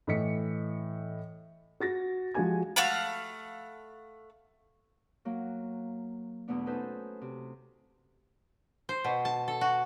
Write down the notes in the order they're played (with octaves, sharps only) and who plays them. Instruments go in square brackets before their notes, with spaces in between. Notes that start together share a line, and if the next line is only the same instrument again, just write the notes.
[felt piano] A2 E3 D#5 B6 C#7
F#4 A6 A#6
F3 G#3 F#4 G4 G#5 G#6
[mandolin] A3 F5 F#5 B5
[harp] F#3 A#3 F#4
E2 B2 A3 B3 D4
C#4 D#4 F#4 A4 B4 C5
C3
[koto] C5
B2
A5
A4
F#4